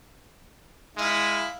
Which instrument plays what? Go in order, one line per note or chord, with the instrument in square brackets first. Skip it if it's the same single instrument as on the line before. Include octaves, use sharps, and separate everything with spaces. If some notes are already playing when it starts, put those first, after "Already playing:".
[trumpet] G#3 [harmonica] E4 F5